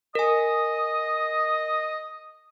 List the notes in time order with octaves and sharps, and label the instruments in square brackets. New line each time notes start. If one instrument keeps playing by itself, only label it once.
[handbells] A#4 G#5 [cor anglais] D#5 [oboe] D#6